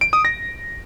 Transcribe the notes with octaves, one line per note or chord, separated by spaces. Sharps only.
D7
D#6
A#6